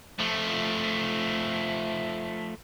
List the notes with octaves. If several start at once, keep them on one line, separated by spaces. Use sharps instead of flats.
F3 A3